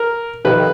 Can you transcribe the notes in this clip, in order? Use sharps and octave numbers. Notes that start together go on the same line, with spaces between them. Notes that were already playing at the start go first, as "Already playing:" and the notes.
Already playing: A#4
F2 C3 D#3 B4